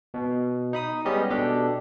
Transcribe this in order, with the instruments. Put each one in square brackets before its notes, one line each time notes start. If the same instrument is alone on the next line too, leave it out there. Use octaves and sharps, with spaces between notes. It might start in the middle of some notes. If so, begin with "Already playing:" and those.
[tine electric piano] B2
D#4 B5 D#6
G3 G#3 B3 C#4 G4 D#5
B2 D4 G4 A4